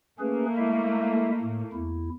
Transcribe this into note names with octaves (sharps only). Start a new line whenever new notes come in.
A3 A#3 C#4 G#4 B4
G#3 E4 E5
A2
E2 E4